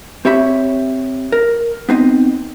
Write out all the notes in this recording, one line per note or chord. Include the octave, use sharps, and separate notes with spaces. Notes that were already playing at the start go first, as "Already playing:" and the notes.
C4 G4 C#5 E5 B5
A#4
B3 C4 D#4 D#5